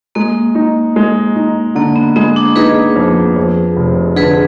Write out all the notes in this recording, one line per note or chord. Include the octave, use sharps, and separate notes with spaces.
G#3 A#3
D#4
G#3
D#4
D3 A#3
B3
G#3 B3
D4
D#4 G#4 B4
F2
F2
F1
D3 G#4 B4